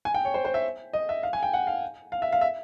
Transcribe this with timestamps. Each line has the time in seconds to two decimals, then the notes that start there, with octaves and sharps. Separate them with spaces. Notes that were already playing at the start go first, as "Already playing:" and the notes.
0.05 G#5
0.14 G5
0.25 C#5
0.34 C5
0.45 C5
0.54 E5
0.93 D#5
1.09 E5
1.23 F5
1.33 G#5
1.43 G5
1.53 F#5
1.67 F5
2.12 F5
2.22 E5
2.32 F5
2.41 E5